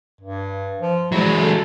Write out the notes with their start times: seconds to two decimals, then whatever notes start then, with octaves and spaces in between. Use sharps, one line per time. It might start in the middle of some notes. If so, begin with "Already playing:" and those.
0.21 G2
0.81 F3
1.12 F#3 G#3 E4
1.42 A4